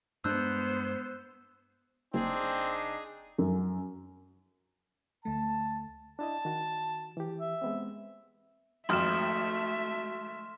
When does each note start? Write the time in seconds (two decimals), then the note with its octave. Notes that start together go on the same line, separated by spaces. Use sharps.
0.24 G2 G#3 B3 D4 C5 E6 F#6 G6
2.14 F#1 C4 D4 D#4 G#4
3.38 F#2
5.25 D2 A3 A5
6.19 D4 E4 D#5 A5
6.45 D#3 F#4
7.17 E3 G4
7.40 E5
7.62 G#3 B3 C4
8.89 G#1 F2 A3 F#4 E5 C6 F6 E7